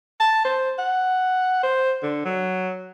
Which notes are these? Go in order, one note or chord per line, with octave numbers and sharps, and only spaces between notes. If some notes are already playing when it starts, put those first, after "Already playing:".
A5
C5
F#5
C5
D3
F#3